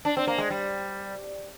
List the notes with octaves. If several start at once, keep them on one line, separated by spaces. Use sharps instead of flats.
D4
C4
A#3
G#3
G3